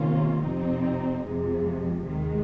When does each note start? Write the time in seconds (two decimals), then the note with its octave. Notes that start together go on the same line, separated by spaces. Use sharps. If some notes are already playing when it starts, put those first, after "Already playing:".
Already playing: C3 D#3 A#3 C#4 F4
0.42 F2 C3 F3 C4 D#4
1.23 F2 C3 F3 G#3
2.05 D#2 D#3 G#3